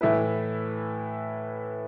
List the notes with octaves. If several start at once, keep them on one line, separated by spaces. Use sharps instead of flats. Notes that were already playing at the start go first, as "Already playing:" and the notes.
A2 E3 A3 E4 B4